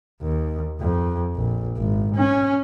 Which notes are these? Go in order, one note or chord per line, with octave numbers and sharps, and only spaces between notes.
D#2
F2
A#1
G#1
C#4